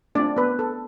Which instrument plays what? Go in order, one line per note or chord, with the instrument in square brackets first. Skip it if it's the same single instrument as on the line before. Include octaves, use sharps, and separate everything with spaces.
[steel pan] A3 C4 D4 F4 D5
B3 B4
A4